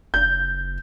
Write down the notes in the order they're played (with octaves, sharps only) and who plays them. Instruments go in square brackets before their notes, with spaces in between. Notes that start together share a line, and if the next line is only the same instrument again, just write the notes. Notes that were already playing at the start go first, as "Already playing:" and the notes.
[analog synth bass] F#1 [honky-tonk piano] G6